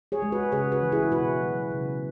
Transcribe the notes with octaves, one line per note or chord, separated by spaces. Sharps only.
G#4 C#5
G#3
F#4 B4
C#3 G#4 C#5
F#4 B4
E3
E4 G#4
B2 F#4 B4
F#3
C#3